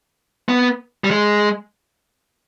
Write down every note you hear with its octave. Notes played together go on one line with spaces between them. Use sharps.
B3
G3
G#3